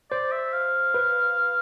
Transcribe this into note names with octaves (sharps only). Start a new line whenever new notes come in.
C5 D5
E5
F5
B4